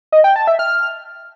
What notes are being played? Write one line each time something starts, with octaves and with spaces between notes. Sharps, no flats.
D#5
G5
A5
E5
F6